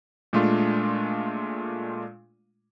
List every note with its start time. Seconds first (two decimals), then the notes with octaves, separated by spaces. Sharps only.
0.33 A#2 G#3 A3 D4 F4